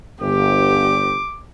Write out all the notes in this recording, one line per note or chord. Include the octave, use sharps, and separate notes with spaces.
G1 G4 D6